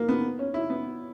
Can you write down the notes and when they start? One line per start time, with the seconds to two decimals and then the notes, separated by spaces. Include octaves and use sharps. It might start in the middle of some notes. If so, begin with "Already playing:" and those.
Already playing: A#3
0.09 B3
0.39 C#4
0.54 E4
0.70 B3